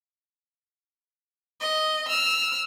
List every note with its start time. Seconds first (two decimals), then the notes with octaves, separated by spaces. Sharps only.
1.61 D#5
2.08 E6 F6